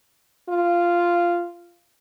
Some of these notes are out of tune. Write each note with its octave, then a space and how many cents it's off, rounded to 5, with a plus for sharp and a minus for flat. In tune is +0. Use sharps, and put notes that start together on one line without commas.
F4 -10